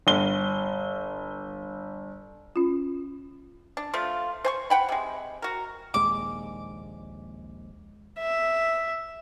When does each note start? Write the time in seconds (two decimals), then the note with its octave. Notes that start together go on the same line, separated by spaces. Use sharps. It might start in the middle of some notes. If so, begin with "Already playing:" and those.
0.07 G1 G7
2.56 C#4 F4
3.77 D4
3.94 F3 A3 F4
4.44 C5 G#5 C#6
4.70 F#5 G5 B5
4.89 C3 G#3
5.42 F#4 A#4
5.94 A#1 D#2 G#3 D6
8.20 E5